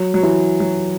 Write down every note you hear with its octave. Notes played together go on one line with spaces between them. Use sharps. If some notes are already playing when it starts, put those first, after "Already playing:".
Already playing: F#3
F#3
E3
F#3